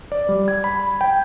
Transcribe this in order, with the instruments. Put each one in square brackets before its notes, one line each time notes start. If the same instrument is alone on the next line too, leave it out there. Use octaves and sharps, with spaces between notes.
[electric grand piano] D5
G3
G#6
B5
G5